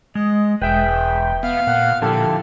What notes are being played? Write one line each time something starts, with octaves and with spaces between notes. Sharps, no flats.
G#3 D#5
E1 G#4 B4 E5 G5
B3 F5
A#2 F#5
A#2 D3 F3 E4 G4 A4